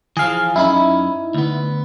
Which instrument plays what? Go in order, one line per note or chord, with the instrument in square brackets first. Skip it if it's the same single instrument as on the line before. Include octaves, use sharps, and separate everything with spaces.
[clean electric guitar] E3 F3 [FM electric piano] G#4 F5
[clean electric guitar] F#2 C#4 B5 [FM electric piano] D#4 E4
[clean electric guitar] D2 B3